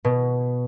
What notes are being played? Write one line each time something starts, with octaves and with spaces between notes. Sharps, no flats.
B2